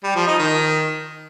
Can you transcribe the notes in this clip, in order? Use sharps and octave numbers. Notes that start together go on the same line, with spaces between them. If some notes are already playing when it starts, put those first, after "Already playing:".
G3
F3
D#4
D#3